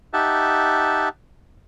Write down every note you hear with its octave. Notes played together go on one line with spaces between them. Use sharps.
D#4 G4 E5 F#5 A5